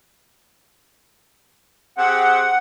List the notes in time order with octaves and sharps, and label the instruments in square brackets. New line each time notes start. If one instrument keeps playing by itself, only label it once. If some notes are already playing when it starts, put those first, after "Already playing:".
[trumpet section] C4 G4 G#4 [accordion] F#5